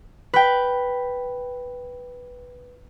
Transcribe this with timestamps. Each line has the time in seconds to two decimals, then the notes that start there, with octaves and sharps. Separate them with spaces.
0.34 B4 G5